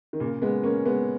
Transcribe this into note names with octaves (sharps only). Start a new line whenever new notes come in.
D#3
A#2 C#3
G#3 B3
A#3 C#4
G#3 B3